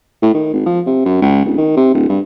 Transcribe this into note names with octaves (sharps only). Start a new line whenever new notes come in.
A2
D#3
G#1
F3
C3
F#2
C#2
D1
D#3
C3
D1
G2